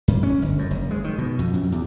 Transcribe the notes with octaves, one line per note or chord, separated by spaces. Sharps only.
F#2
C#4
G1
F#2
F#1
G#3
D#3
B2
F2
F#2
E2